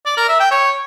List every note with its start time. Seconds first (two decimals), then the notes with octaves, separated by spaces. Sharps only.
0.06 D5
0.17 A#4
0.28 E5
0.40 G5
0.51 C#5